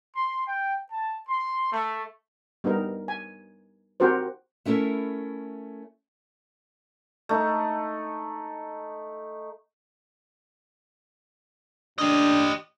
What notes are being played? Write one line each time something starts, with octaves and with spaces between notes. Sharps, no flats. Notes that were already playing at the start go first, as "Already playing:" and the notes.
C6
G5
A5
C6
A3
G3 B3 D#4 A#4
G#5
C4 F#4 G4 A#4 C5
A3 C#4 E4 A4 A#4
A3 D#4
A2 C#3 D4 G4 D#5